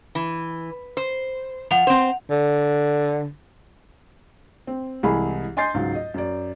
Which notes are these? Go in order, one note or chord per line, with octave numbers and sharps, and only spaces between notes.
E3
C5
F3 F#5 F7
C4 C5
D3
C4
C2 E3 G#3 G#4 B5
D#5 G#5 C6 G6 A6 C7
C#2 G#2 F#3
D#5
F#2 D5